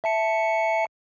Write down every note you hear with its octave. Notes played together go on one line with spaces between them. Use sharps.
E5 A5 C#7